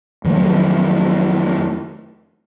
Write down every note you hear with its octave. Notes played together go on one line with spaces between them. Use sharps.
F2 D#3 F#3 A3